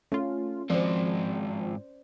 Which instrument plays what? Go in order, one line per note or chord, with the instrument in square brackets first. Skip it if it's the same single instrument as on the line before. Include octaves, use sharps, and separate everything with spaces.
[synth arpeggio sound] A3 F4 [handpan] C#4
[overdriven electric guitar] G#2 C4 [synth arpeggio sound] F3 [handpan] C5 D5